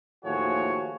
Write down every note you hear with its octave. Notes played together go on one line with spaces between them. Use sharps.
D#2 A2 F3 F#4 G#4 C#5